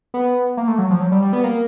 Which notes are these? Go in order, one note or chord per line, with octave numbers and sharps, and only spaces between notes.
B3
A#3
A3
F#3
F3
F#3
G3
G3
B3
A#3